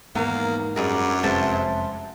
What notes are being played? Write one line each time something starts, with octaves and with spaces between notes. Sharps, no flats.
E2 G#2 D#3 A#3 B3
F#2 G3 G#4 A#4 D5
F1 G#3 C4 B4 C5 E5 A5